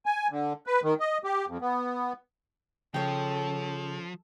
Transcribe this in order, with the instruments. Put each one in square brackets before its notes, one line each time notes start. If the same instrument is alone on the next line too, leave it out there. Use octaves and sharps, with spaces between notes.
[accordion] G#5
D3
B4
D#3
D#5
G4
F2
B3
[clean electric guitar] C#3 [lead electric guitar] F3 [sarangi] A4 [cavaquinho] C#5 G5